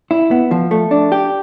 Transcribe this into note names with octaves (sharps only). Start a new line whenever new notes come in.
E4
B3
F3
A3
D4
G4